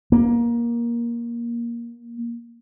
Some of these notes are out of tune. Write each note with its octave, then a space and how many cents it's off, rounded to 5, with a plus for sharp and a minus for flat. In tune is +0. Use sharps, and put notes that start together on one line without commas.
A#3 +15